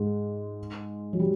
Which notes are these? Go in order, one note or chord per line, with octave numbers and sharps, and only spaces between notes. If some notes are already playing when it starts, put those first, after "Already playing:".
Already playing: G#2 G#3
F#3
G3